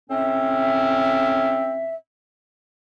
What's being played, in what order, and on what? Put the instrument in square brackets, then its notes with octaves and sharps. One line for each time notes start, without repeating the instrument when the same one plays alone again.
[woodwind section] A2 C4 C#4 E5